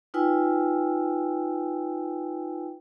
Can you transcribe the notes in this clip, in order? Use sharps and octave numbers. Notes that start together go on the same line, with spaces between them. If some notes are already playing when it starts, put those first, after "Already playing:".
D#4 F4 B4 G5 G#5 E6